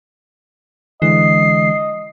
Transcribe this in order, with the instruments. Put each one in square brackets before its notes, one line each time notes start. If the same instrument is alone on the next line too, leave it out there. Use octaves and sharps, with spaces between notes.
[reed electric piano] D3 G#3 [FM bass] E3 [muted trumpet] D#5 [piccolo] C7